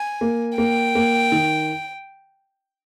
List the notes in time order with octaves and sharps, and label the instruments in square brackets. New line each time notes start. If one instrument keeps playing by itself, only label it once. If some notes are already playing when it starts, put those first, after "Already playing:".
Already playing: [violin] G#5
[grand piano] A#3
[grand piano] A#3 [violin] G5
[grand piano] A#3
D#3